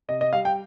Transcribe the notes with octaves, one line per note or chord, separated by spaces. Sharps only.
C3 D#5
D#5
G3 F5
G5